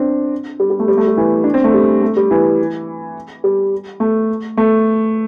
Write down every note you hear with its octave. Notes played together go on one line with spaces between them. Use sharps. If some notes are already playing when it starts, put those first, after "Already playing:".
Already playing: C4 D4
G3
G3
A3
G3
A3
G3
E3
D4
C4
A3
G3
A3
G3
E3
G3
A3
A3